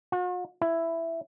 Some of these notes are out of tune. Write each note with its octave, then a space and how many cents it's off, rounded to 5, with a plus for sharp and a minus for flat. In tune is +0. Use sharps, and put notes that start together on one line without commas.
F#4 -45
E4 +5